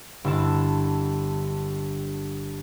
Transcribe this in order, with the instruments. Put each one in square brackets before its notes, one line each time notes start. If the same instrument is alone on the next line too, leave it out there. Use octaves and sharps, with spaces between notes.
[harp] G1 E4 A5